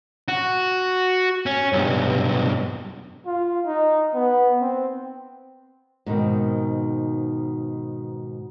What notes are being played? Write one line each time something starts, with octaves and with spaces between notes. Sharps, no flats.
F#4
C#4
B1 G2
F4
D#4
B3
C4
G#2 B2 D#3 C4